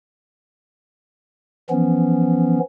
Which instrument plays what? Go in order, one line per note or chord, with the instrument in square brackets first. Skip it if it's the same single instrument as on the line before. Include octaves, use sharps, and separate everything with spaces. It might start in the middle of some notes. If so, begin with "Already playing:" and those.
[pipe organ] E3 F3 B3 C#4